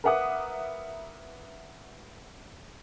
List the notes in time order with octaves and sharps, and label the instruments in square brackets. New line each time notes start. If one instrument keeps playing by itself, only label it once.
[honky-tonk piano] A#4 B4 E5 F#5 D6 D#6